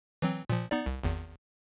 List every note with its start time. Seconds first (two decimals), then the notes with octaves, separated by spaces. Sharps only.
0.22 E3 F#3 C4
0.49 A#2 F3
0.71 B3 D#4 D5
0.86 C2
1.03 G#1 E2